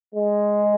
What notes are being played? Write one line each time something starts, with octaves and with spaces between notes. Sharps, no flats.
G#3